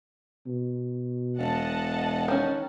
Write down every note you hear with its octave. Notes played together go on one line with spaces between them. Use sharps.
B2
E1 D#5 F#5 A5
D#3 C#4